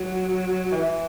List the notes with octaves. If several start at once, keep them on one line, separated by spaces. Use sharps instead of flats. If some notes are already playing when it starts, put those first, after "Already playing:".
Already playing: F#3
E3